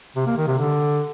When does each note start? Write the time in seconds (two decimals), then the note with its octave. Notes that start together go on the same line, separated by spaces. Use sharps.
0.16 C3
0.26 A#3
0.37 D#3
0.47 C3
0.58 D3